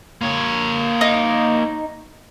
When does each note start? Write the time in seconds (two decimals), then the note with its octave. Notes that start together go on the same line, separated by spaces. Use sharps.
0.22 A#3 C#5
1.01 D#4